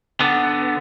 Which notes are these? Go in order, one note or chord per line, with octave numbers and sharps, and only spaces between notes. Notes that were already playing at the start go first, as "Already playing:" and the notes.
D3 B3